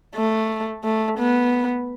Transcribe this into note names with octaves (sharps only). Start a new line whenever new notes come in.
A3
A3
B3